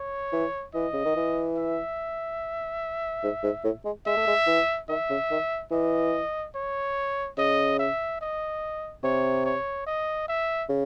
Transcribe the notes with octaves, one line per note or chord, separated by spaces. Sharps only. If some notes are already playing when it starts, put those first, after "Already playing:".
Already playing: C#5
E3
E3 D#5
C#3
D#3
E3
E5
G#2
G#2
A2
G#3
G#3 E5
A3
G#3
E3
D#3 E5
C#3
D#3
E3 D#5
C#5
C#3 D#5
E5
D#5
C3 C#5
C#5
D#5
E5
C#3